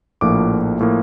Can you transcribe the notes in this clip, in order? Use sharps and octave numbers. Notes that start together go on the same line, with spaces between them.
A#1 A2 F3 A#3 D6
A2 F3 A#3